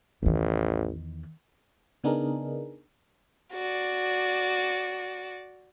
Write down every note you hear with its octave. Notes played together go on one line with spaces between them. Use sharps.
A1 E2 D#3
C#3 B3 D4 D#4 G#4 A#4
F#4 D5